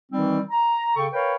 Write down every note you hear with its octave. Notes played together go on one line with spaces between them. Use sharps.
D#3 E3 G3 C4 D#4
A#5
C#3 A4 G5 C#6
A#4 B4 C#5 F5 G5 B5